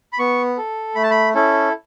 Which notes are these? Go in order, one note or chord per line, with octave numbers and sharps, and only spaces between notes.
B5
B3 C#6
A4
A3 B5
A5
B5
C#4 E4 A4